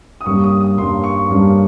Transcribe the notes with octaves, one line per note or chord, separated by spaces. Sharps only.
D#6
G2 G3 A#3 C#4 C#6
D#6
D#6
G2 G3 A#3 C#4 C6
C#6
G2 G3 A#3 C#4